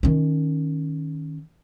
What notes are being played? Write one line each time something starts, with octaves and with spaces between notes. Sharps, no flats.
D#3 C#4